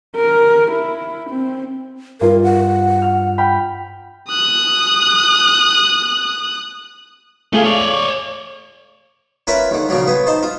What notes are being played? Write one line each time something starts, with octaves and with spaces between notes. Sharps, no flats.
A#4
E4
C4
G2 F4 A#4
F#5
F6
G5 B5 F6
D#6 F#6
A3 F4 G#4 F5
C#5 D5
F#7
C#4 F4 A#4 B4 E5
D#2 D3
A#2 C#3 F3 F#3
B3 G#4
D#4 C5 A5
F4